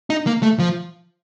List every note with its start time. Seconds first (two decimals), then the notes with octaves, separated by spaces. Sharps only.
0.10 D#4
0.27 A#3
0.43 A3
0.59 F3